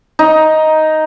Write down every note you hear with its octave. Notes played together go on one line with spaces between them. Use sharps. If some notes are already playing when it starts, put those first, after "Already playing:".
D#4